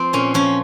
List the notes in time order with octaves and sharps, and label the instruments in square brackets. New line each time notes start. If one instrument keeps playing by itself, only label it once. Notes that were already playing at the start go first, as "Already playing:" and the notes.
Already playing: [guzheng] F3 C4
A#2 C#4
F3 C#4